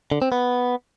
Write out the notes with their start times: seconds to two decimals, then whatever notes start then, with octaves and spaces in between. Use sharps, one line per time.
0.12 D3
0.22 C4
0.32 B3